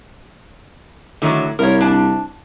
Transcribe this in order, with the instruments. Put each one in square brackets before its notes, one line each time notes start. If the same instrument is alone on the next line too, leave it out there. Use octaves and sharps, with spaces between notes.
[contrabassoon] A2 [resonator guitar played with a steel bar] D3 D#3 F#3
[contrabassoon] C2 [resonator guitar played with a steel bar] A#4 C#5
[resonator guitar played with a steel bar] D4 A5